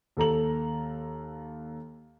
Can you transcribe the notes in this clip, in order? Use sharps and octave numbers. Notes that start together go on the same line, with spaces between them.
D#2 A4 A#5 F#7